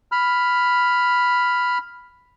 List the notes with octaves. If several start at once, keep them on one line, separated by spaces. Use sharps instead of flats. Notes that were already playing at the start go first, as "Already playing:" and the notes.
B5 F6